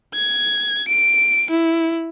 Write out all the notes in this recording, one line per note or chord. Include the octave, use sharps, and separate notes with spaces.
G#6
D7
E4